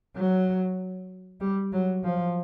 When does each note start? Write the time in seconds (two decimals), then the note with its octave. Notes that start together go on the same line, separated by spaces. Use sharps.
0.16 F#3
1.40 G3
1.73 F#3
2.04 F3